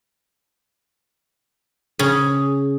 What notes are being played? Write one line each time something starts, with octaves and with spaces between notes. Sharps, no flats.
C#3 G#4